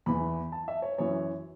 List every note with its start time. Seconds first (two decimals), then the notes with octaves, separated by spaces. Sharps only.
0.06 E2 E3 B5
0.52 A5
0.68 E5
0.82 C#5
0.98 F#2 E3 C#5